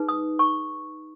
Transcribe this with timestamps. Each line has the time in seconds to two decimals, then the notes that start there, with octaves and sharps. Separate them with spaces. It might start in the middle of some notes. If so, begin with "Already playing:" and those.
Already playing: D#4 G#4 B4
0.09 D#6
0.39 C#6